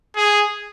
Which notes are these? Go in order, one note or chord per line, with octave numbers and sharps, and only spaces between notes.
G#4